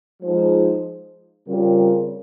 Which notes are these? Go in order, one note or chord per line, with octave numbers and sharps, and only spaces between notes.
F3 G#3 D#4 G#4 C5
C#3 G3 C4 F4 A#4